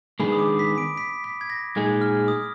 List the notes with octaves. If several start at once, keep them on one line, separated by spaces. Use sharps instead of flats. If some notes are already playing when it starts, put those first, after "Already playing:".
D#3 G#3 B3 D4 G#4 B5
D#6
D6
B6
D7
B6
B6
G#6
A#6
A#2 G#3 D#4 G#4 G#6
F6
D#6